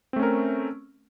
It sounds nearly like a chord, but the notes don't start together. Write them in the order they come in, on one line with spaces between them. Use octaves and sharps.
C4 A3 C#4 A#4